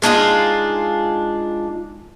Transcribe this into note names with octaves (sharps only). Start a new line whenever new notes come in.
G#3 D4 D#4 F4